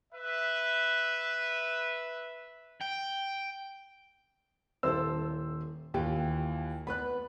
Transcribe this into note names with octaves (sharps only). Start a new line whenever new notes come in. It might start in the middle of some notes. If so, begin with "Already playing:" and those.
B4 E5
G5
D#1 G3 E4 A4 C5 E6
D#2 E3 F4 G4 G5
B3 B4 D5 B5 F#6